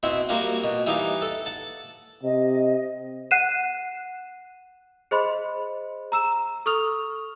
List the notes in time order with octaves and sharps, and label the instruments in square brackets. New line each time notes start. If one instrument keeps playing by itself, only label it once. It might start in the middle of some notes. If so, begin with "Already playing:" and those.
[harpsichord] B2 C4 E4 C5 F#5
F3 G3 A#3 F#4
B2
E3 G3 D#4 D#5 F5
A4
F#5 A5
[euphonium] C3 [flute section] D#5
[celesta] F#5 F#6 C7 D#7 E7
G#4 C5 D#5 B5 C6
A#5 E6 E7
A4 C#6 D#6 F6 F7